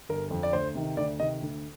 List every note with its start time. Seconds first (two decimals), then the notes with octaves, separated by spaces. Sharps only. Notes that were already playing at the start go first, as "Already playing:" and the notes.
0.09 G1 A#4
0.31 F2 D3
0.43 D5
0.53 D2 C5
0.75 C3 D#3
0.96 D2 D5
1.19 C3 D#3 D#5
1.41 D2